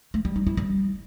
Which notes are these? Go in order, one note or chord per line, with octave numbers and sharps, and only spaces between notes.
A3
G3
D#4
E4
G3